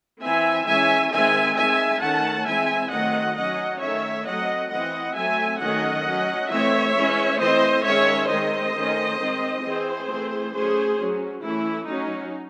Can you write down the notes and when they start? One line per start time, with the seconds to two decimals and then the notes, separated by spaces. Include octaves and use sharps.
0.21 E3 C4 E5 G#5
0.66 E3 G#3 C#4 E5 G#5
1.11 D#3 G#3 C4 E5 G#5
1.56 D#3 G#3 C4 E5 G#5
2.01 D#3 A3 C#4 F#5 A5
2.46 E3 G#3 C4 E5 G#5
2.90 D#3 F#3 A3 C4 D#5 F#5
3.35 F#3 C#4 D#5 F#5
3.80 D#3 A3 C#4 C#5 E5
4.25 F#3 A3 C4 D#5 F#5
4.70 E3 C4 D#5 F#5
5.15 F#3 A3 C4 E5 G#5
5.59 D#3 F#3 A3 C#4 D#5 F#5
6.05 F#3 C#4
6.49 E3 A3 C4 C#5 E5
6.94 E3 G#3 C#4
7.39 E3 A3 C4 C5 D#5
7.84 D#3 G#3 C#4 C#5 E5
8.28 D#3 G#3 C4 C5 D#5
8.73 D#3 A3 C#4
9.18 D#3 G#3 C4
9.63 E3 C4 G#4 C5
10.08 E3 A3 C4
10.53 F#3 A3 C#4 G#4 C5
10.97 F#3 C#4
11.42 E3 A3 C#4 E4
11.86 F#3 C#4 D#4